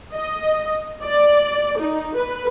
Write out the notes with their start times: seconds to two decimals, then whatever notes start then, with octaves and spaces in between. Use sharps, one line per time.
0.14 D#5
1.03 D5
1.79 D#4
2.15 B4